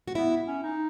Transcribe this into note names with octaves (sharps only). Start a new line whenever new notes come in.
F#4
B3 E4
C#4
D#4